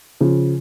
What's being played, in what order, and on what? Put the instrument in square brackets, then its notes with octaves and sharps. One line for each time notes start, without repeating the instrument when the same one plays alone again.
[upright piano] C#3 F3